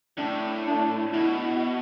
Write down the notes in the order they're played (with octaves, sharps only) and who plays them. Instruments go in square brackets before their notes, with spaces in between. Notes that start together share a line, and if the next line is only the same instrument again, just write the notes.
[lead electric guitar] A2 [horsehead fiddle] D4
[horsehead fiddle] D4
[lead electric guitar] B2 [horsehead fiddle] E4